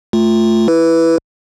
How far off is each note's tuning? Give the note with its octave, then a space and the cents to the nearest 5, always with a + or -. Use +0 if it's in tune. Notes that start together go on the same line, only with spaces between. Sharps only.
A3 +0 F4 +0
E4 +0 B4 +0